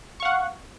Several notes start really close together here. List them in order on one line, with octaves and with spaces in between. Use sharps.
C#6 F5 F#5